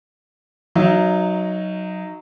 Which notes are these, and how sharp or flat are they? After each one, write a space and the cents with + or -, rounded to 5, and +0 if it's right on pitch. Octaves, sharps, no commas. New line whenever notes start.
F#3 +0 D#4 +0 E5 +40